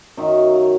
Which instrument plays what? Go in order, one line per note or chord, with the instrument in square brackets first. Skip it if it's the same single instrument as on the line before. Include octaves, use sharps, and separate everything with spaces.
[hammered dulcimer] F#2 D#3 F#3 E5
F5